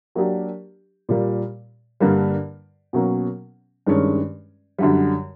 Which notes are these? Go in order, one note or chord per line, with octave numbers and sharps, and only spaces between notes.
F#3 A#3 D4 G4
A#2 G3 A#3
G2 D3 G3 A#3
B2 F#3 A#3 C#4
G2 D#3 G#3 C#4
F#2 D3 G3